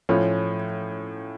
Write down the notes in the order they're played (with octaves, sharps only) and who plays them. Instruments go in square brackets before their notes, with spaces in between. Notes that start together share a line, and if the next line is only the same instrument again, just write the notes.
[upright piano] A2 F3 C#4